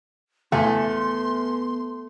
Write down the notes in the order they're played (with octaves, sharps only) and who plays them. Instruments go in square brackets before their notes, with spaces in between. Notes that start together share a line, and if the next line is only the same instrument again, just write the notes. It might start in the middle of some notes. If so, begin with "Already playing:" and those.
[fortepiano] E2 G#5 [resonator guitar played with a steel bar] A3 [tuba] B3 [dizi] C6